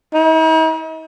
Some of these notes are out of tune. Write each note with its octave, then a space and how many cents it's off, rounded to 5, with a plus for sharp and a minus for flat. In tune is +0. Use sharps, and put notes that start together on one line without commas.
D#4 +45